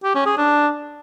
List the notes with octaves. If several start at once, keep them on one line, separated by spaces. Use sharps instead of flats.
G4
C#4
G#4
D4